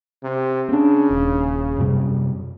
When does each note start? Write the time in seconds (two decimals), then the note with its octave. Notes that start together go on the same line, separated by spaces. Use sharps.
0.23 C3
0.69 C#3 C4 D4
1.11 D#1
1.78 F#2 C3 G3